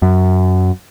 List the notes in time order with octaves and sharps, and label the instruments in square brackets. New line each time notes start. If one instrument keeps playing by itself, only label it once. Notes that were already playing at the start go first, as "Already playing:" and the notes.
[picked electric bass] F#2